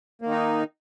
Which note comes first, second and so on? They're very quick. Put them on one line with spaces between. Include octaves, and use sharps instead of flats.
A#3 D#3 D#4